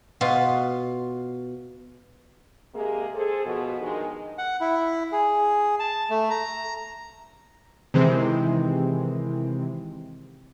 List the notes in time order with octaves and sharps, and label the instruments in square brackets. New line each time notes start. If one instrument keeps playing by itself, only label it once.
[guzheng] B2 F4
[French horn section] C3 G#3 A#3 G4 G#4
G#4 A4 C5
B2 F3
G2 D#3 G#3
[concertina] F#5
E4
G#4
A5
A3
A#5
[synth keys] C3 D#3 E3 G#3 C4